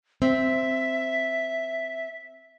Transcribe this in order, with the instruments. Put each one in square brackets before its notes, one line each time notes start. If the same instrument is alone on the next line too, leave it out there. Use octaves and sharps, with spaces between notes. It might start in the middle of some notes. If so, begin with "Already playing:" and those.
[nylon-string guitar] C4 [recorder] E5